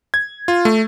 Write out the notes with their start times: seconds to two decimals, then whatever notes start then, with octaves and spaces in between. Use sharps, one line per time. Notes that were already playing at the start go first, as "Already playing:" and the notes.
0.14 G#6
0.48 F4
0.65 A3